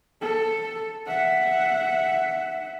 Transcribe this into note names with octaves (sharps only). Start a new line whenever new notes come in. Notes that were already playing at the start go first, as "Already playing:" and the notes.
A4
E5 F#5